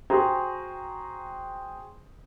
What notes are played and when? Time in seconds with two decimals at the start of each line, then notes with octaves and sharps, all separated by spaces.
0.10 F#4 G#4 C5 G5 G#5 A#5